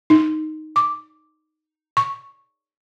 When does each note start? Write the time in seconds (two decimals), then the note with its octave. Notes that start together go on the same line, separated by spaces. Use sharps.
0.10 D#4
0.76 D6
1.97 C#6